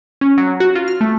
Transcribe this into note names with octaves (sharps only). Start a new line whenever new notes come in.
C#4
F#3
F#4
F4
F6
A3